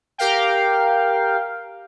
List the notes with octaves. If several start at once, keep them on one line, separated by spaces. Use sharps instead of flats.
G4 A#4 F5 G5